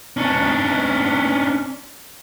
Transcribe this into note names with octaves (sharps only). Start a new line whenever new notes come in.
C#4 D4